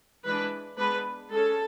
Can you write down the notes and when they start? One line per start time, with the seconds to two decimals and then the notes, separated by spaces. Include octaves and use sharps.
0.25 E3 G#3 D4 B4
0.78 G#3 B3 D4 B4
1.31 G#3 C#4 A4